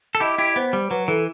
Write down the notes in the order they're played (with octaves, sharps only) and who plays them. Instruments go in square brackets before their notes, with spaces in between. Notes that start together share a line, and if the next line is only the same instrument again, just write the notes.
[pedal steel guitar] A4
[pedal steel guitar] E4 G4 [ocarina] D#5
[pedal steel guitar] E4 G4
[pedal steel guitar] B3 [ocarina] C5
[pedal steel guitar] G3
[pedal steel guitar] F#3 [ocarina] B4
[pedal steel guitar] E3 [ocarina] A4